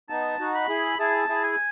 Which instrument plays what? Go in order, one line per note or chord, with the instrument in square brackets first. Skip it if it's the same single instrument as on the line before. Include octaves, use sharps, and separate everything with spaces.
[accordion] B3 D#4 [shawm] A5
[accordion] D#4 F#4
[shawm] B5
[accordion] E4 G#4
[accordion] E4 G#4 [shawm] A5
[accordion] E4 G#4
[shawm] G#5